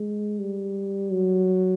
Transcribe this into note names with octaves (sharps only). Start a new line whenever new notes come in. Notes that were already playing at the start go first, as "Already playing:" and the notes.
Already playing: G#3
G3
F#3